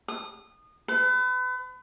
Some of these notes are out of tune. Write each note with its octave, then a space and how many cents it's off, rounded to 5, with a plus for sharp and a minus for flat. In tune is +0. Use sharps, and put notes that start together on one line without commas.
D#6 -25
B4 +35